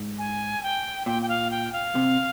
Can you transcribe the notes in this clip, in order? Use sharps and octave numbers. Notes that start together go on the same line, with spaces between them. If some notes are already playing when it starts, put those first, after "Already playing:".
Already playing: G#2
G#5
G5
A#2 G5
G5
F5
G5
F5
C3